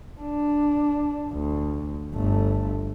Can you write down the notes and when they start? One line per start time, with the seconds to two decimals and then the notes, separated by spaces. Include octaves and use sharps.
0.21 D4
1.31 D2
2.14 G1 A3